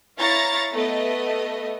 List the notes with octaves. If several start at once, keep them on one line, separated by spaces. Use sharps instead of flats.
E4 C#5 F5 A#5 C#6 A6
A3 B3 D#5